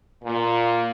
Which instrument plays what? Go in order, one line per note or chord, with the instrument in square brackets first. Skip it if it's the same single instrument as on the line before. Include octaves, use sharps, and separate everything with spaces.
[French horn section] A#2